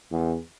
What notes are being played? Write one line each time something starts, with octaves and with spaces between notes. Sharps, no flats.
E2